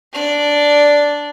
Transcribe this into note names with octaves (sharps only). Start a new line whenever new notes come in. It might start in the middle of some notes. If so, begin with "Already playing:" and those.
D4 D5